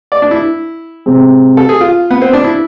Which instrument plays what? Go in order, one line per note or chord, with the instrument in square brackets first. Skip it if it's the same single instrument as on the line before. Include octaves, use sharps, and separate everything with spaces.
[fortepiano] D5
D4
E4
[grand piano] C3 G#3 C4
[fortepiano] A4
G#4
F4
B3
C4
D4
E4